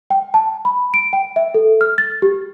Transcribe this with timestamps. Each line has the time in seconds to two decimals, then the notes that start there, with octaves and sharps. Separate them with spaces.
0.10 G5
0.34 A5
0.65 B5
0.94 D7
1.13 G5
1.36 E5
1.54 A4
1.81 F6
1.98 A6
2.22 G4